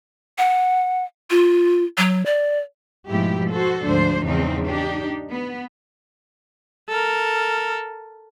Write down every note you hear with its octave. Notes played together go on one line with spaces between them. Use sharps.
F#5
F4
F#3
D5
G#2 B2 F3 A3 E4 G4
F#4 A4 C5
D2 G#2 F3 D4 C5
E2 G#2 C#3 F3 C4 D#4
D4 D#4 G4
B3
A4 A#4